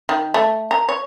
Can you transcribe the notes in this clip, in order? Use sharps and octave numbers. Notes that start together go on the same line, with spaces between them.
D#3
A3
A#4
C#5